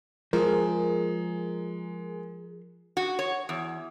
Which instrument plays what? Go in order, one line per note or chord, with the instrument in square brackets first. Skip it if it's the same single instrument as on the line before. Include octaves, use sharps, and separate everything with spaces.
[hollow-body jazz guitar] F3 [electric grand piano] G#3 [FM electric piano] G#4 A#4
[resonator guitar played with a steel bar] F#4
C#5
E2